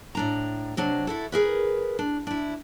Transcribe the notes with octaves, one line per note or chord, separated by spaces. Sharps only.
A2 D4 A#5
C3 F#3 D4
E4 F#4 A4
G#4 A#4 B4
D4
D4 E4